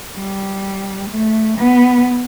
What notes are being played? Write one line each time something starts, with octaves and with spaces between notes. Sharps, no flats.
G3
A3
B3